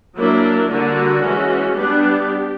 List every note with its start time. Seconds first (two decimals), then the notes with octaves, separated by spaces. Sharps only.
0.16 F#3 A#3 D4 E4
0.69 D3 G3 A#3 D4 F#4
1.23 E3 G#3 C#4
1.75 G3 B3 D4 G4